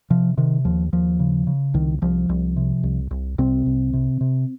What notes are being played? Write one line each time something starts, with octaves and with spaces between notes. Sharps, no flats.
C3 F3
C3 D#3
D#2 F3
D#2 F3
C#3
C#3
C2 D#3
C2 F3
C2
C3
C2
C2
C2 C3 C4
C2
C3
C3